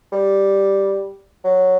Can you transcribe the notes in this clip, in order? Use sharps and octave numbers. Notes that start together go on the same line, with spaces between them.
G3
F#3